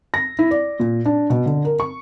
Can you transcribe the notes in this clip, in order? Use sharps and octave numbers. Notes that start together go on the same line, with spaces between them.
A#6
E4
D5
A#2
D4
B2
D3
A#4
C#6